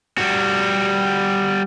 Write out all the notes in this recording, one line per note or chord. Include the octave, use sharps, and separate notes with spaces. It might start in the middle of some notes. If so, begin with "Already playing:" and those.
G3 F#4